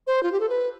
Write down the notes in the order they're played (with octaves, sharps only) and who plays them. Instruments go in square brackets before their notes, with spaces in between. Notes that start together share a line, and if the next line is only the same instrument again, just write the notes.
[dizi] C5
F4
G4
A4
B4